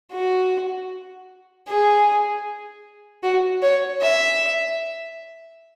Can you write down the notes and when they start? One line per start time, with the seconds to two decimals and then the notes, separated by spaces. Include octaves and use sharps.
0.12 F#4
1.67 G#4
3.23 F#4
3.62 C#5
4.01 E5